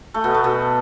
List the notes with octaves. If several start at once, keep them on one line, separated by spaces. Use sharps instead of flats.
A3
B2 B3
A3
B2 B3